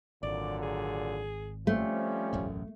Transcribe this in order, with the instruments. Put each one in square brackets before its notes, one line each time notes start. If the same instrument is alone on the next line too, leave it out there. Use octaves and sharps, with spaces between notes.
[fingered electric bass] G#1 [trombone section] A#2 D3 F#3 [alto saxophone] D5
[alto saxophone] G#4
[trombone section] F3 G3 C#4 [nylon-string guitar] A3 [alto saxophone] C4
[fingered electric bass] E1 A1 F#2